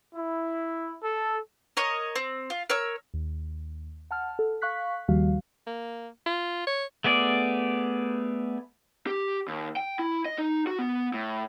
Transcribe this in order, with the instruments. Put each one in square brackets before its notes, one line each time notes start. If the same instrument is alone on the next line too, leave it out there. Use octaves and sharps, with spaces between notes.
[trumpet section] E4
A4
[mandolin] A#4 C#5 D#5
C4
F4
A#4 C#5 E6
[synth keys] D#2
F#5 A5 F6
A4
F5 C#6 F#6 B6
D#2 D#3 F3 G3 F#4 F5
[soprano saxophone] A#3
F4
C#5
[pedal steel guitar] A3 B3 G#4 D5
[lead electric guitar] G4
D#2
G5
E4
D#5
D#4
F#4
B3
A2